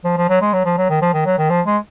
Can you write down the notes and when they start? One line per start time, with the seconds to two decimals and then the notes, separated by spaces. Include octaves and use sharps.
0.04 F3
0.17 F3
0.29 F#3
0.41 G#3
0.53 F#3
0.65 F3
0.77 F#3
0.90 D#3
1.02 F3
1.14 D#3
1.26 F#3
1.38 D#3
1.50 F3
1.66 G#3